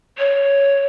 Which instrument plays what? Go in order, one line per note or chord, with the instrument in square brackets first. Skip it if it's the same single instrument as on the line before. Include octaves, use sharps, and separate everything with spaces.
[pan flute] C#5